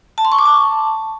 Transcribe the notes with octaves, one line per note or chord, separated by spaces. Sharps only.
A5
C6
C#6
D6
A5